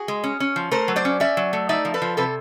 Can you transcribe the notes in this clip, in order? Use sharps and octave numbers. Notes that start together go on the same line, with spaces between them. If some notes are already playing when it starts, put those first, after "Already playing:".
Already playing: F#4 G#4
G#3
C#4
C#4
F3
A3 A#4 C5
F#3
C5 D5
C#4
C#4 D5 E5
F#3
A3
D#4 D5 E5
F3
A4 B4
F3
C3 A4 B4